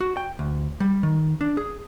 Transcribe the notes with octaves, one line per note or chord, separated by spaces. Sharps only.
F#4
G5
D2
G3
D#3
D4
G#4